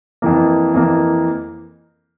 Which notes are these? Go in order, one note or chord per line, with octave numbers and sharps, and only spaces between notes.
F2 E3 A#3
F2 E3 A#3